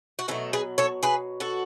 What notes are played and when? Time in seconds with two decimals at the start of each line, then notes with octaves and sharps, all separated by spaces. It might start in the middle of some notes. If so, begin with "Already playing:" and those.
0.19 F#4
0.28 B2 F#3 A3 C#4 E4
0.53 G#4 B4
0.78 A4 C#5
1.03 G#4 B4
1.40 F#4 A4